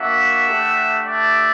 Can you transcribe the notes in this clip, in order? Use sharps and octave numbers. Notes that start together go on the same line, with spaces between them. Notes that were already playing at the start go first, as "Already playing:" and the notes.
Already playing: A#3 D4 F#4 E5 F#5
A3 D4 G4
D5 E5